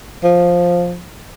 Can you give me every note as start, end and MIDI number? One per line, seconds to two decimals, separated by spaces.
0.24 1.03 53